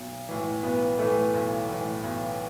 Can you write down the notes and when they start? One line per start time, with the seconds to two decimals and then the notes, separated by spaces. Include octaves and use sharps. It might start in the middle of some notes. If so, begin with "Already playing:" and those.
Already playing: B1
0.29 A2 E3
0.63 B1 B3
0.98 A2 E3 A3
1.34 B1
1.69 A2 E3
2.04 B1